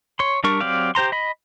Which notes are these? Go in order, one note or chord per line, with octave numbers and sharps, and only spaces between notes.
C#5 C6
G3 D4 A#4 C#6
F#3 C4 G4 D5 F5
G4 C5 A#5 C6
D#5 B5